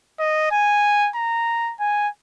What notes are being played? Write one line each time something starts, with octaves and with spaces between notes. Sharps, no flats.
D#5
G#5
A#5
G#5